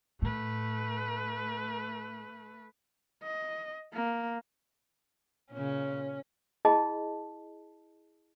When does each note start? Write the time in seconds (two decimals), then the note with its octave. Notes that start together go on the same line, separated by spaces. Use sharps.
0.22 A2 A3 B4
3.23 D#5
3.93 A#3
5.52 A#2 C#3 C#4
6.65 E4 G#4 D#5 A5